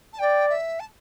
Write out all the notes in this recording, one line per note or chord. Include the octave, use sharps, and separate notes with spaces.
A5
D5 G5
E5
A5